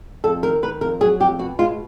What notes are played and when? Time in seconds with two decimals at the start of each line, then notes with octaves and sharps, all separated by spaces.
0.24 F2 A4
0.43 D#3 A#4
0.62 D#3 B4
0.81 F2 A#4
1.01 F#3 G#4
1.20 F2 G4
1.39 B2 F#4
1.59 G#3 F4